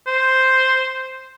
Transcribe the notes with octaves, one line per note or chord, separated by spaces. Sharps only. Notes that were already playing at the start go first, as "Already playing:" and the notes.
C5